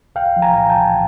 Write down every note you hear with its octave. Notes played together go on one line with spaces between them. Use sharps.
C2 F5 G5
F3
G#5 A#5
A#2
G5 A5
C2